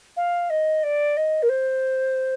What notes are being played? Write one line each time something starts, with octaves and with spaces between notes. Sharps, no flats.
F5
D#5
D5
D#5
A#4
C5